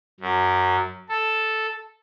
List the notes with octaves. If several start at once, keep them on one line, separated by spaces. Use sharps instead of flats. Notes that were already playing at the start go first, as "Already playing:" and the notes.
F#2
A4